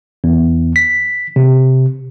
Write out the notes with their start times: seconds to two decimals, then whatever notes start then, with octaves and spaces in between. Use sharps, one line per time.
0.24 E2
0.76 B6
1.36 C3